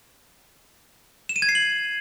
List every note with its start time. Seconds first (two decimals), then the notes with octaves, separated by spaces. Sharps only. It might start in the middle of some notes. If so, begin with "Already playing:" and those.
1.29 E7
1.36 D#7
1.42 G#6
1.49 C7
1.55 F#7